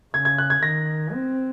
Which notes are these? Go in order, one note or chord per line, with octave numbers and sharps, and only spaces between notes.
C#3 G#6
G#6
F#6
G#6
D#3 A#6
C4